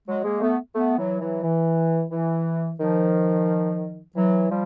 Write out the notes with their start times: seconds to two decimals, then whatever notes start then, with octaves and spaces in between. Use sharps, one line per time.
0.07 F#3 G#3
0.24 G#3 A#3
0.41 A3 B3
0.75 A3 B3
0.98 E3 F#3
1.20 E3 F#3
1.43 E3
2.11 E3
2.79 D#3 F3
4.15 E3 F#3
4.50 F3 G3